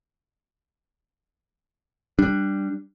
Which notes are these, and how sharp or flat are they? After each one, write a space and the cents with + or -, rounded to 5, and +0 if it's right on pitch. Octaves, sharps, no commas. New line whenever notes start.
G3 +0 D4 +0